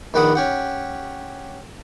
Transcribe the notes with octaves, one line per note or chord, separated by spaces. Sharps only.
A#1 D#3 B4 D5 F#5 D#6
C#4 G4 F#5